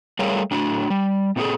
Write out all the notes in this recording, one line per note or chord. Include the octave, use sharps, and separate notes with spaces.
G3 A3 G#4 A#4 C#5 F5
A2 D4 F#4
G3
A#2 C4 E4 F#4 G#4 A4